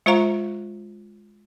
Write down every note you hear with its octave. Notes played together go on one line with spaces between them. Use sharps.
G#3 F4 C5 F5 A#5 C#6